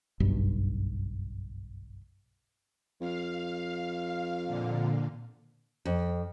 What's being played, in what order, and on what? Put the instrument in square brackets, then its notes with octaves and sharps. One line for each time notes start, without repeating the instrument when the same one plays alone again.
[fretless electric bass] F#1 B1 G2
[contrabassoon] F2 [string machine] F5
[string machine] A#2 D3
[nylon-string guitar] F2